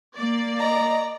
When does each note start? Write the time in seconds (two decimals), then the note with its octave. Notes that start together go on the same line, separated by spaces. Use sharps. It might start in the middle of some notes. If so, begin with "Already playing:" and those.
0.18 A#3 D5
0.59 D#5 A#5